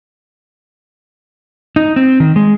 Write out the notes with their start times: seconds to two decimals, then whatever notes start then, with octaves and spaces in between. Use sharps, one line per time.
1.76 D#4
1.96 C4
2.20 D#3
2.36 G#3